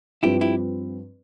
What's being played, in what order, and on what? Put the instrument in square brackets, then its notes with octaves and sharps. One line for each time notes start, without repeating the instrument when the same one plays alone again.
[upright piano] G2 F3 C4 F4 B4 [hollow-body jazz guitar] E4 G4
[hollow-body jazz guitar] E4 G4